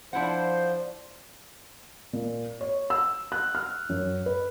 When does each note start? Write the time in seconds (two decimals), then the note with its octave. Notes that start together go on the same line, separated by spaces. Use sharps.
0.13 F3 D4 E4 C5 F#5
2.13 A#2
2.61 C#5
2.90 E6
3.32 F#6
3.55 F6
3.89 F#2
4.26 B4